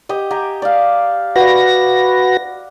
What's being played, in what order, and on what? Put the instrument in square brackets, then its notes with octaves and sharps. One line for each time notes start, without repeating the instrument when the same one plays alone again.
[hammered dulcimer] G4 D#5
G4 G#5 A#5
D5 F5
[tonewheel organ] F#4 B4 A#6 [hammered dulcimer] D5 F#5